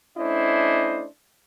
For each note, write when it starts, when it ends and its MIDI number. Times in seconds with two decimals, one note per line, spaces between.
0.18 1.05 57
0.18 1.05 61
0.18 1.05 62
0.18 1.05 64
0.18 1.05 72
0.18 1.05 75